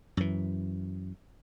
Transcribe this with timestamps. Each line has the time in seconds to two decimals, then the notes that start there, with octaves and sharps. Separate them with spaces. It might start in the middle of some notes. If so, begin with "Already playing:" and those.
0.17 F#2 E3